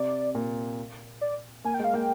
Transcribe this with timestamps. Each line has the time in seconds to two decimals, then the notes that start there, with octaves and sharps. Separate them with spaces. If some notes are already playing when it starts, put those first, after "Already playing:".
Already playing: C3 D5
0.35 A#2
1.21 D5
1.64 A#3 G#5
1.74 G5
1.80 G#3 F5
1.94 A#3 G5